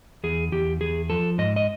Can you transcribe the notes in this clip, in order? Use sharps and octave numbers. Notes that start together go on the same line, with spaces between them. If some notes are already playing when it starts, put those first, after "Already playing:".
E2 G#4
E2 G4
E2 G#4
F3 A4
G#2 D#5
D#5